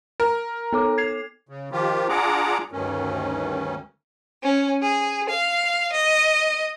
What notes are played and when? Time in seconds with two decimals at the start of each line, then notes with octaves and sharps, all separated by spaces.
0.20 A#4
0.73 B3 A4 D6
0.98 G#6 C7 F7
1.49 C#3
1.72 D#3 F3 F4 G4
2.09 D4 F4 G#4 F#5 A#5 D6
2.72 D2 G2 D#3 C#4
4.42 C#4
4.82 G#4
5.28 F5
5.91 D#5